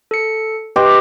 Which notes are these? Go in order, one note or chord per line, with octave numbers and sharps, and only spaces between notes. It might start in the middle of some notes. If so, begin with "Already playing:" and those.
A4 C#7
G4 B4 D#5 C6